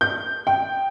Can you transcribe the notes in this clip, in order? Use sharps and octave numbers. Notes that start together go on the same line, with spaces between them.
G6
G5